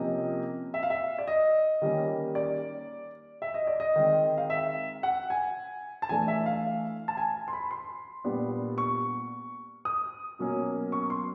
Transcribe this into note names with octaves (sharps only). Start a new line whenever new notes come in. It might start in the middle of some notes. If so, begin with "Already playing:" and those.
Already playing: C3 F3 A#3 C#4 D#5
E5
F5
E5
D5
D#5
D#3 G3 A#3 C#4
D5
E5
D#5
D5
D#5
D#3 G#3 C4
F5
E5
F#5
G#5
A5
E3 A3 D4 G#5
E5
F5
A5
G#5
C6
B5
C6
A#2 G3 B3 D4
C#6
D#6
B2 F#3 A#3 C#4
C#6
C6